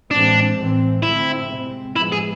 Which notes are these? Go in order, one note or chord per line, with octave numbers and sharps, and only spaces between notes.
A2 E3 G#3 C4 D4
A2 E3 G#3 C4
D3 A3 C4 E4
C3 G#3 C4
A2 F3 G#3 B3 E4
G#4